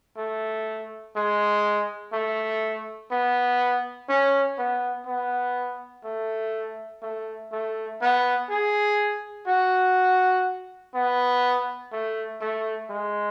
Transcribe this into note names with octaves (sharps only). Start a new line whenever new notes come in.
A3
G#3
A3
B3
C#4
B3
B3
A3
A3
A3
B3
G#4
F#4
B3
A3
A3
G#3